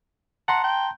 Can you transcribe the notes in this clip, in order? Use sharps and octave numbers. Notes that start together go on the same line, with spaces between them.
F#5 A5 A#5 C6
G5